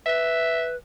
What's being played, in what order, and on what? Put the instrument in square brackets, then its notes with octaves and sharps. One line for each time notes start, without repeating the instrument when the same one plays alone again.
[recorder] B4 [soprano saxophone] E5